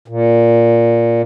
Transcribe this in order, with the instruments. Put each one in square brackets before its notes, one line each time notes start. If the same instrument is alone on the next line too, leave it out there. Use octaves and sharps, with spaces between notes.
[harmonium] A#2